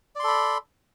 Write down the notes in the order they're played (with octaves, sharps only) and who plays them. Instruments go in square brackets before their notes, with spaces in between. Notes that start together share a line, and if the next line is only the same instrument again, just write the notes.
[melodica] D5
C6
A4
B5